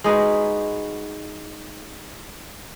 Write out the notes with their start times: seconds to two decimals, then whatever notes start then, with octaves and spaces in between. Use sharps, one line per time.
0.04 G#3 D#4 F#4 B4